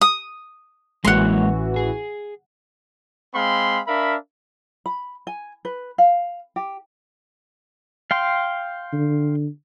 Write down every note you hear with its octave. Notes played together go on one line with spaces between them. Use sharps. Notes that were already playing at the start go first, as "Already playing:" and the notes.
D#6
A1 E3 G#3 A#3 F#4 C#5 F#5 C6
G#4
G#3 C4 F5 B5 C6
D4 A#4 E5 F5 B5
B5
G#5
B4
F5
G4
F5 G5 C6
D3